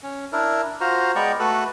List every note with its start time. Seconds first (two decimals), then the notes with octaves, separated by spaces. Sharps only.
0.03 C#4
0.33 D4 E4 A#4
0.81 F4 F#4 C5 A#5
1.16 G#3 B3 D5 G5 A#5 C#6
1.40 A3 F#4 A4 B4